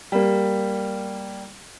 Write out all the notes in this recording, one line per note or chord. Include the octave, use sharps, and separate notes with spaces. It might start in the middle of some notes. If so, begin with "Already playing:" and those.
G3 A#3